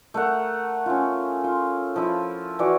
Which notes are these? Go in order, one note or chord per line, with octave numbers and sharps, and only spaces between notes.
A3 A#4 F#5
C#4 F4
F4
F3 E4
E3 F#4 D5